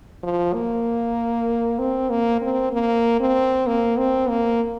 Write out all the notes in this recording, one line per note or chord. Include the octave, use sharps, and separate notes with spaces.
F3
A#3
C4
A#3
C4
A#3
C4
A#3
C4
A#3